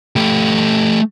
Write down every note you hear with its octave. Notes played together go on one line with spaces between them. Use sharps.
A3 G4